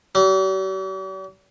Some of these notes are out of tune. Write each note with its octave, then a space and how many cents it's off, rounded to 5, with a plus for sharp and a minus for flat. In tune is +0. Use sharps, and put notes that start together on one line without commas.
G3 -45